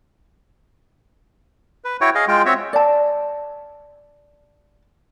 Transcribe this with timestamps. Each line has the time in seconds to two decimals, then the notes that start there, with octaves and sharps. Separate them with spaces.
1.84 B4
2.01 E4 F#4 C#5 G5
2.15 G#4 D#5 F5
2.28 G#3 F4 G5
2.46 C4 F#4 C#5 E5
2.73 D5 A5